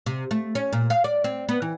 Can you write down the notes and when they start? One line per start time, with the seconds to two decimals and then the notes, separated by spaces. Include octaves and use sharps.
0.06 C3
0.31 A3
0.55 C#4
0.73 A#2
0.90 F5
1.04 D5
1.24 C4
1.49 B3
1.62 E3